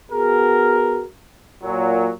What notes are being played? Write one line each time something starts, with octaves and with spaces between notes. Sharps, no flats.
B3 F#4 G#4 A#4
A#2 F#3